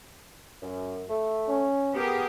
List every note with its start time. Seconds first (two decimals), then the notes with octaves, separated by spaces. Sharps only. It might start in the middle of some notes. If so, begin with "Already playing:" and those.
0.63 F#2
1.10 A3
1.48 C#4
1.94 B3 G4 G#4 A#4